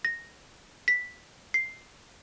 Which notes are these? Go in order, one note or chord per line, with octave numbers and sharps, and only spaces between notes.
A#6
B6
C7